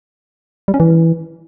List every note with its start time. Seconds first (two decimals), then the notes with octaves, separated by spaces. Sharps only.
0.68 G3
0.74 C#4
0.80 E3